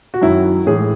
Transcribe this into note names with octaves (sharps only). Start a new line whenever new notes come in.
F#4
F#2 D#3 F#3 E4
A2 E3 G#3 G#4